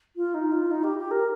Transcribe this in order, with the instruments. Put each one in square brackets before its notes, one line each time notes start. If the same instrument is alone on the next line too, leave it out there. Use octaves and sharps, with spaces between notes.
[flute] F4
D#4
F4
D#4
G4
G4
A#4